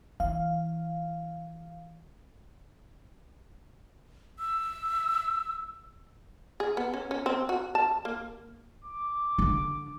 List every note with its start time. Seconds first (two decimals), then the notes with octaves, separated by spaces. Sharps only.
0.20 E3 F5
4.39 E6
6.60 G#4
6.77 B3
6.94 C#4
7.11 C#4
7.26 C4
7.49 F#4
7.75 A5
8.05 A#3
8.84 D6
9.38 D3 D4